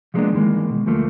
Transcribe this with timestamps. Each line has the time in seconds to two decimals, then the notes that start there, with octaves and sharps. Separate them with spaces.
0.14 F3 G3 G#3 A#3 B3 D4
0.33 D#3 E3 F#3 G#3 A#3
0.70 B2
0.86 D2 F3 A3 A#3